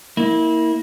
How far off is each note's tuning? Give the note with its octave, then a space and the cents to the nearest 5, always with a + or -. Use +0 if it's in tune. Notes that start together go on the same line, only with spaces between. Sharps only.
A#3 +0 E4 -25